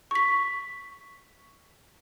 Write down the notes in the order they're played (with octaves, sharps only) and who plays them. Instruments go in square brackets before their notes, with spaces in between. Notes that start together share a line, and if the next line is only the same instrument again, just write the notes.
[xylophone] C#6 B6